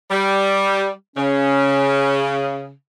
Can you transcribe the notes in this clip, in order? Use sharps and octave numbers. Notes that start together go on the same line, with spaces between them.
G3
C#3 C#4